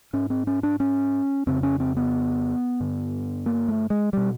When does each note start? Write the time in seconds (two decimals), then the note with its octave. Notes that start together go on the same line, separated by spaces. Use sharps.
0.13 G#2 C#4
0.30 C4
0.47 C#4
0.63 D4
0.80 C#4
1.47 F2 C#3 C4
1.63 C#4
1.80 C4
1.97 B3
2.80 G2 D3
3.46 A#3
3.69 A3
3.90 G#3
4.13 B2 G3